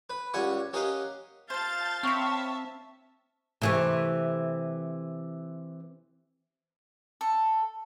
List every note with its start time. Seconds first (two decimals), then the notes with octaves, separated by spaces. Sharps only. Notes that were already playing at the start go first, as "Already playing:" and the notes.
0.10 B4
0.34 C#2 G3 F#5 G#5 C#6
0.73 C#4 G4 A#4 D#5 F5 F#5
1.50 F4 C5 F5 A5 G6 A6
2.03 C4 C#5 E5 A5 B5
3.62 C3 E3 A3
7.21 A4